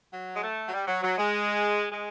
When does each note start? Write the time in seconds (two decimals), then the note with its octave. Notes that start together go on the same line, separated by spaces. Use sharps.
0.12 F#3
0.36 G#3
0.42 A3
0.67 F#3
0.72 G3
0.87 F#3
1.02 F#3
1.18 G#3
1.92 G#3